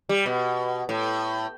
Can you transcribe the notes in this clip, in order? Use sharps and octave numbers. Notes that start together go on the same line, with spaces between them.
G3
B2
A2